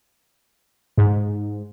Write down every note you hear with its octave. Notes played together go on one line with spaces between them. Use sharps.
G#2